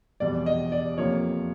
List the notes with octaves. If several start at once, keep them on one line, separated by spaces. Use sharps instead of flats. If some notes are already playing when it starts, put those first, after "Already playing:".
F1 E2 B2 G3 D5
D#5
D5
F2 C3 F3 A#3 C#5